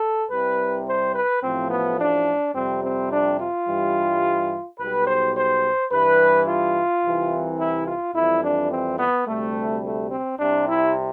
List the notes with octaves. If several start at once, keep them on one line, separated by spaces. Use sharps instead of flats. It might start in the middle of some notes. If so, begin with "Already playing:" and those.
Already playing: A4
C2 C3 G3 B4
C5
B4
A1 A2 F3 C4
B3
D4
F2 C3 G3 C4
C4
D4
F4
G2 E3 G3
B1 B2 G3 B4
C5
C5
G2 E3 G3 B4
F4
C2 C3 E3
E4
F4
F2 E3 G3 E4
D4
C4
B3
D2 C3 G3 A3
A3
C4
C2 C3 G3 D4
E4